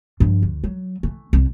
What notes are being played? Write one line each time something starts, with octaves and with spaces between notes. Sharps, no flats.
G2 F3
D2
F#3
E3 A3
C2